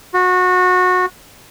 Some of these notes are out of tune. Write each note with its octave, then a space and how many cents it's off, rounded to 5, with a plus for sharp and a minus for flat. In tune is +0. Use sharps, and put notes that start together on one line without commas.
F#4 -25